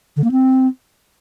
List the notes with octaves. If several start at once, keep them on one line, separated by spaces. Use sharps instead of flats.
D3
A#3
C4